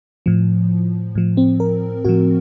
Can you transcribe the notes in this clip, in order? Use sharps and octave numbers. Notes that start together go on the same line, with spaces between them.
A2 F3
A2 F3
C4
A#4
A2 F3 F#4